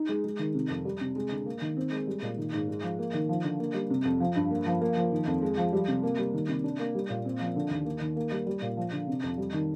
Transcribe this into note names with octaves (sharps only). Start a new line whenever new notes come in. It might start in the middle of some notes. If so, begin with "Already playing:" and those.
Already playing: D#4
G#3
G#3
D#3
C3
F2
G3
C3
G#3
D3
A#3
D#3
C4
G#3
G3
A#2
D#3
G#2
G#3
F3
A#3
D#3
F3
D3
A#3
G3
C3
F2
F3
G2
A#3
F3
A#3
F3
D#3
F2
G#3
F3
G3
C3
A#3
G3
D#3
C3
D4
A#3
G3
A#2
C4
F3
D3
D#2
A#3
D#3
A#3
G3
G3
A#2
F3
D3
C3
F2
G3
D#3